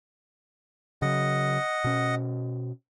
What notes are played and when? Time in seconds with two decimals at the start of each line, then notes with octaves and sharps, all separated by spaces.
1.02 C#3 F#3 D#5 F#5
1.84 B2 C#4